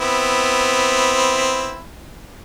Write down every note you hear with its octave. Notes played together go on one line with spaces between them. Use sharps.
B3 C4 E4